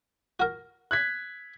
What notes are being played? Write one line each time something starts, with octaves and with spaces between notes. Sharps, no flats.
F#4 A#4
F#6 G#6 B6